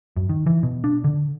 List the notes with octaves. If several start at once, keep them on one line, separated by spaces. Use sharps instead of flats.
F#2
D#3
E3
B2
D4
D3